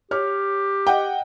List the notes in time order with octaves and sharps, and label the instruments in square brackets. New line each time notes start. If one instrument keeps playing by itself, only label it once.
[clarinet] G4 [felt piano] C#5 F6
[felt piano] D#5 F#5 G5